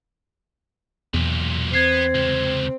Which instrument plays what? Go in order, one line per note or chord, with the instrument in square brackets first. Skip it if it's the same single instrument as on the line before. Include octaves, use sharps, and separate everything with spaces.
[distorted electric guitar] B1 A#2 [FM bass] E2
[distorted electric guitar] B3 [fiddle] C4 [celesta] G#6 C7
[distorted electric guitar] C#2 C3